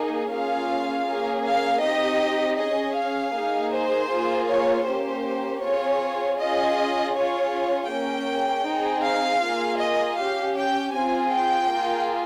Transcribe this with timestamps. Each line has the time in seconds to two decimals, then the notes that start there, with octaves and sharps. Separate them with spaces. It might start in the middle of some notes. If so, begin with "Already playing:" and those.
Already playing: A#3 D#4 G#4
0.31 A#3 C#4 F4 G#4 F5
1.06 A#3 C#4 G#4
1.44 F5
1.82 C4 D#4 G4 D#5
2.58 C#4 G#4 D#5
2.96 F5
3.35 A#3 D#4 G#4
3.72 C5
4.10 A#3 F4 G#4
4.49 C#5
4.86 A#3 C#4 G4 C5
5.62 C4 F4 G#4 C#5
6.39 C#4 F4 G#4 D#5
7.15 C#4 F4 G#4 C#5
7.90 A#3 C#4 G#4 G5
8.66 C4 D#4 G#4
9.05 F5
9.43 A#3 F4 G#4
9.80 D#5
10.19 C#4 G4 F5
10.57 G5
10.94 C4 F4 G#4 G#5
11.32 G5
11.71 A#3 F4 G#4